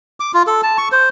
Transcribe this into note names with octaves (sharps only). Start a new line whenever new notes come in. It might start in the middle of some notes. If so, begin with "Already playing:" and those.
D6
F4
A4
A5
C#6
C5